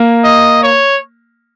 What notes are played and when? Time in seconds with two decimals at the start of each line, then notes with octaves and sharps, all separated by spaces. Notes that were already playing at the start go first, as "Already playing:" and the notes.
Already playing: A#3
0.24 D#5
0.63 C#5